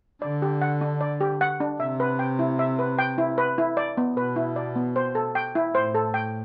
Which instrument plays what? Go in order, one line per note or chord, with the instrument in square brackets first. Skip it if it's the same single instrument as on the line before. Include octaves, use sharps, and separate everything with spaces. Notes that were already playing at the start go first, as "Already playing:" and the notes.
[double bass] D3 [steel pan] D5
[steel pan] G4
F#5
D4
D5
G4
F#5
D4
[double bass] C3 [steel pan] E5
[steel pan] B4
G5
E4
E5
B4
G5
E4
B4
E4
D5
B3
[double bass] B2 [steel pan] B4
[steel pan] E4
D5
B3
C5
A4
G5
E4
[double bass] A2 [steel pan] C5
[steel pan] A4
G5